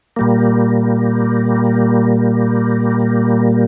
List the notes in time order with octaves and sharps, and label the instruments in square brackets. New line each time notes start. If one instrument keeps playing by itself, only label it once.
[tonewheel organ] A#2 G3 A#3